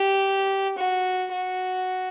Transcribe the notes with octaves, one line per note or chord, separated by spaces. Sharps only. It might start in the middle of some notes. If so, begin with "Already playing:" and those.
Already playing: G4
F#4
F#4